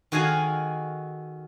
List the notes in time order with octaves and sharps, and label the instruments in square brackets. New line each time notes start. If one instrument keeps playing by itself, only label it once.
[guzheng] D#3 F#4 G#4 A4 F5 G#5